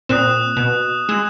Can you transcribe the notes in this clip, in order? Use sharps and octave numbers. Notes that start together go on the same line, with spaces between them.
A#2 C4 D#6 F#6 E7
B2
G#3 E6 G#6 E7